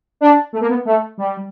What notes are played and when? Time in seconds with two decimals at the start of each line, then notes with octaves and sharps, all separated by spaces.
0.21 D4
0.53 A3
0.61 A#3
0.69 B3
0.85 A3
1.18 G3